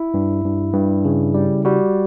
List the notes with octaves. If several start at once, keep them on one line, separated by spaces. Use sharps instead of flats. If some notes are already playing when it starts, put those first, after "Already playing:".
Already playing: E4
G2
G2
G2
C#3
G3
G3 F#4